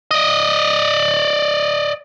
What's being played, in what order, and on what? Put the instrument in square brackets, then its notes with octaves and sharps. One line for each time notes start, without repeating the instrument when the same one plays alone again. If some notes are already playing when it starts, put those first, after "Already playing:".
[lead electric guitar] D5 D#5